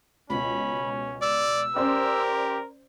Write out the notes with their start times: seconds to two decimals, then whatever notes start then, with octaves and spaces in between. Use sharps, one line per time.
0.30 C#2 B2 C#4 B5
1.22 D5 E6
1.76 C#4 G4 A#4 C5 D5